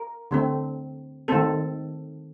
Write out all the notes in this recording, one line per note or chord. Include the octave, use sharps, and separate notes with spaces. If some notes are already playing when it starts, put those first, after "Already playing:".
Already playing: A#4
D3 A3 C4
D#3 A3 C4 A4